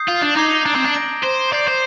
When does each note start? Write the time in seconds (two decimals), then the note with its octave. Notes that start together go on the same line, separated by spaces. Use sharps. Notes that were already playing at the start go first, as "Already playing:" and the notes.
Already playing: D#6 G6 C7
0.08 F4
0.22 D4
0.36 D#4 A#5 D6 G#6 C7 G7
0.66 D4
0.75 C4
0.85 D4
0.94 G6 A#6 D7
1.24 C5
1.53 D5 D6 G6 C7 F7
1.68 C5